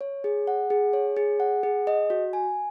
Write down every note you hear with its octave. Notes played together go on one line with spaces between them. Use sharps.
C#5
G#4
F#5
G#4
C#5
G#4
F#5
G#4
D#5
F#4
G#5